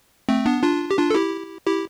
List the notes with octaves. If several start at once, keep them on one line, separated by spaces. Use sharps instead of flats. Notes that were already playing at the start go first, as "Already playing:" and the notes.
A3 C4
B3 D4
D4 F4
G4
D4 F4
A4
E4 G4
E4 G4